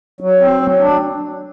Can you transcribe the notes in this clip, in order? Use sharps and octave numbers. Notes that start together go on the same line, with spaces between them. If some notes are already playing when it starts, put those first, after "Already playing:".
F#3
C4
F#3
D4